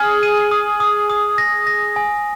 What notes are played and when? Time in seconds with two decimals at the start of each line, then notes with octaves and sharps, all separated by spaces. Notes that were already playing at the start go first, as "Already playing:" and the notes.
Already playing: G#4 F6
0.23 D#7
0.51 D#6
0.80 D#6
1.10 D#6
1.38 A#6
1.67 A#6
1.96 G#5